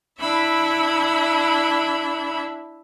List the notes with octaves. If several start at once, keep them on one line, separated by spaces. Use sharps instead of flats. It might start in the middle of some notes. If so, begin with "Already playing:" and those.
D4 E4 E5 B5